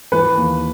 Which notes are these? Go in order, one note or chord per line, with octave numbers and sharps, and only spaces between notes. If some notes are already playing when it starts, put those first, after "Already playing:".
E3 B4
D#2